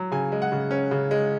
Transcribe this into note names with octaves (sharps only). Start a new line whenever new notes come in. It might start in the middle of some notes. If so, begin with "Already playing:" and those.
Already playing: F#3
C#3 G#5
G#3
F#5
C#3
C#4
C#3
G#3